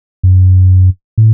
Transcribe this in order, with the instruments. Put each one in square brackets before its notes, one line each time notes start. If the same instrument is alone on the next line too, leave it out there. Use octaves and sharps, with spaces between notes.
[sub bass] F#2
A2